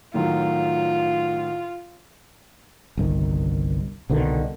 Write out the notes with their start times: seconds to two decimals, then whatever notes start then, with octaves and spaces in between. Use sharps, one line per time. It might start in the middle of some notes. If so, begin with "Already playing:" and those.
0.14 A2 D#3 F#3 F4
2.97 G1 C2 D#3
4.10 C2 B2 D3 D#3